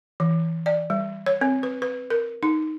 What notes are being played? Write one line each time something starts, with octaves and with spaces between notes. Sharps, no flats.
E3
D5
G3
C#5
C4
B4
B4
A#4
D#4